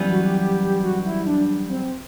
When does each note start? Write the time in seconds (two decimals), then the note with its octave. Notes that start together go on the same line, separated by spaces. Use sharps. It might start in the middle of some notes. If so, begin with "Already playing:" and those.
Already playing: F#2 E3 G3 B3
0.09 F#4
0.25 G4
0.41 G4
0.63 G4
0.83 F#4
1.06 E4
1.26 D4
1.69 C4